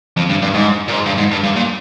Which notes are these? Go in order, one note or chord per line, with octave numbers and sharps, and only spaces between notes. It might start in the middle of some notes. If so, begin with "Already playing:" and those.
F2
G2
G2
G#2
A#2
G#2
G2
G#2
G2
G2
A#2